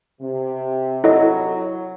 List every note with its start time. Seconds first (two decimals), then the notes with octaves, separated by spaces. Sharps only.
0.21 C3
1.04 F#3 E4 A4 D#5